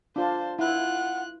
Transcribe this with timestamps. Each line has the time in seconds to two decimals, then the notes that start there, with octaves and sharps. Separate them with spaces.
0.16 D4 F4 C5 A5
0.59 E4 F4 F#5 F#6